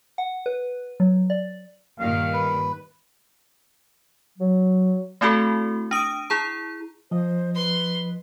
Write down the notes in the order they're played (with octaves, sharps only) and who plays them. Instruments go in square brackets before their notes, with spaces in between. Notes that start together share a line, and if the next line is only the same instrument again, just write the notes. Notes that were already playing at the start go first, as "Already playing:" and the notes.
[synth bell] F#5
B4
F#3
D5
[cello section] G2 A#2 D#3 [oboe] F5
[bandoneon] B4
[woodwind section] F#3
[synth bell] A3 C4 E4 F#4 A4
D4 D#6 D7 D#7
E4 G#4 A#5
[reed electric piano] F3 D#5 [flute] C5
[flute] B4 [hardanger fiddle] C6